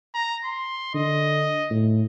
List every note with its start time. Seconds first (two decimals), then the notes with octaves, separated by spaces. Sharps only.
0.14 A#5
0.45 C6
0.94 D3 D#5
1.70 A2